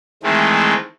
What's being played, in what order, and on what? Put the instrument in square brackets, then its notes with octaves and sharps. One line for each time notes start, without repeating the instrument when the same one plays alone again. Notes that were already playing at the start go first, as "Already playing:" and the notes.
[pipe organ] D#3 E3 G#3 A3 C4